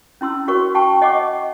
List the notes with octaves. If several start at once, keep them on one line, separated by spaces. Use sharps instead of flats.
C#4 E4 C6 E6
F#4 A#4 B4 C#5 C#6
G5 A5 C#6
C#5 D#5 F#5 G#5 C#6 D6